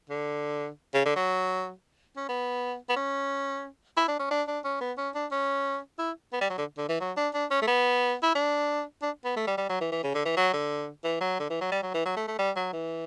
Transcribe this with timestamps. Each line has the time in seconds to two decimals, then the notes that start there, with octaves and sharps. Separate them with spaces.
0.10 D3
0.94 C#3
1.05 D3
1.16 F#3
2.17 C#4
2.29 B3
2.89 B3
2.96 C#4
3.97 E4
4.08 D4
4.19 C#4
4.31 D4
4.48 D4
4.64 C#4
4.81 B3
4.98 C#4
5.15 D4
5.31 C#4
5.99 E4
6.33 B3
6.41 G3
6.50 F#3
6.58 D3
6.78 D3
6.89 E3
7.00 F#3
7.17 D4
7.34 D4
7.51 C#4
7.62 A3
7.67 B3
8.23 E4
8.35 D4
9.02 D4
9.25 B3
9.36 A3
9.47 G3
9.58 G3
9.69 F#3
9.81 E3
9.92 E3
10.03 C#3
10.15 D3
10.25 E3
10.37 F#3
10.53 D3
11.04 E3
11.21 F#3
11.40 D3
11.50 E3
11.61 F#3
11.72 G3
11.83 F#3
11.94 E3
12.06 F#3
12.16 A3
12.28 A3
12.39 G3
12.56 F#3
12.73 E3